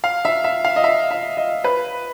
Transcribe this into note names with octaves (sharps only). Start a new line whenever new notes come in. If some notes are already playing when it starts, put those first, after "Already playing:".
F5
E5
E5
F5
D#5
E5
E5
D#5
B4